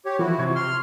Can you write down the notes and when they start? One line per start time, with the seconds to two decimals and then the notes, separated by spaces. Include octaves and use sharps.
0.06 G4 C#5
0.19 E3 F3 E4 F#4
0.38 C3 C#6 G#6
0.56 C6 C#6 F6